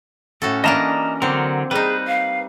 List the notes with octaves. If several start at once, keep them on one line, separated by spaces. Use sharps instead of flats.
A2 C#4 F#4 A4
E3 A#3 D4 D#5 A5 A#5
D3 F#3 C4 A#4
G3 D#4 G#4 B4
F5